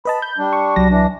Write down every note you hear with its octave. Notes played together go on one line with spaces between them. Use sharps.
B4 D#5 A5 B5
G6
G3 D4
C#6
C2 F#3 A#6
E3 D4